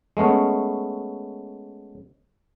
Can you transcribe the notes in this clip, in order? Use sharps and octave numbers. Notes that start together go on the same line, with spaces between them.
G#3 A3 B3 C#4